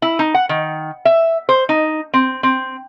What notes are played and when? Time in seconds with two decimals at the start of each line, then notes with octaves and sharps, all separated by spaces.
0.02 E4
0.19 D#4
0.34 F#5
0.49 D#3
1.05 E5
1.49 C5
1.69 D#4
2.14 C4
2.43 C4